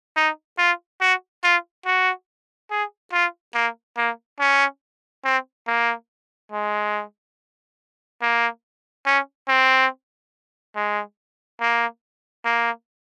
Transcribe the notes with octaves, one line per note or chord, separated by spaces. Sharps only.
D#4
F4
F#4
F4
F#4
G#4
F4
A#3
A#3
C#4
C4
A#3
G#3
A#3
C#4
C4
G#3
A#3
A#3